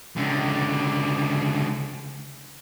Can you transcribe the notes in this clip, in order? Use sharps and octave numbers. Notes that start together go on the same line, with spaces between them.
C#2 D3